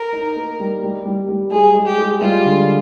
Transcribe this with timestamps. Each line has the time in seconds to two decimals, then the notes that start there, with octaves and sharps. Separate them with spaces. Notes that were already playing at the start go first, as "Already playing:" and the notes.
Already playing: A#4
0.13 D#4
0.36 A#3
0.60 G3
0.83 G3
1.05 G3
1.29 G3
1.52 G#3 G#4
1.75 G#3
1.86 G4
1.98 G#3
2.21 G3 F4
2.44 D3